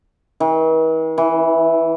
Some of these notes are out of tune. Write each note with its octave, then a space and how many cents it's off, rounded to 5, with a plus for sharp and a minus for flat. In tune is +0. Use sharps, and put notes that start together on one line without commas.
E3 -45
E3 -5